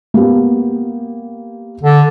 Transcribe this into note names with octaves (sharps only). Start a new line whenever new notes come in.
A#3 B3 G4
D3